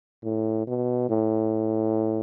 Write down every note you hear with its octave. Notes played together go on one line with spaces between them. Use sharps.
A2
B2
A2